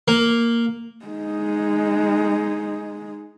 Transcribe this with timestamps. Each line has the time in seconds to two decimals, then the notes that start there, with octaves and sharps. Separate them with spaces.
0.08 A#3
1.06 G#3 D#4